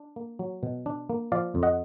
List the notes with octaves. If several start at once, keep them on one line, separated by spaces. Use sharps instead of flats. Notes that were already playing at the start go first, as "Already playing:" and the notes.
Already playing: D4
A#3
F#3
B2
D4
A#3
F3 D5 F5
F2
D#5 F#5